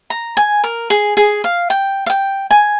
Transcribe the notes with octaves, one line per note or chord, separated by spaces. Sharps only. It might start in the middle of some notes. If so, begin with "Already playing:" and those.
A#5
G#5
A#4
G#4
G#4
F5
G5
F5
G5
G#5